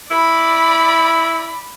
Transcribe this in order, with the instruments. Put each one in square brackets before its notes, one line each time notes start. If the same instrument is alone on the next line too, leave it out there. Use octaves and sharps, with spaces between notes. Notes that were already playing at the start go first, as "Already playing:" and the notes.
[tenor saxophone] E4 [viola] D5 B5